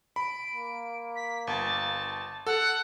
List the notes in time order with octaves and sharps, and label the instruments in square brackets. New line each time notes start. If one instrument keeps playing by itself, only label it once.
[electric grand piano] B5 [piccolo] D7
[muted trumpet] A#3
[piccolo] B6
[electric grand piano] G1 [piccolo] A5
[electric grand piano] A4 [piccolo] F#5